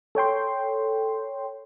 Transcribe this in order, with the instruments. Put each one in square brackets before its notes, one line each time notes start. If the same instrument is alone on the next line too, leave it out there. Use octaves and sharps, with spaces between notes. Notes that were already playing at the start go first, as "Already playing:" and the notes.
[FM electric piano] A4 C#5 G5 C6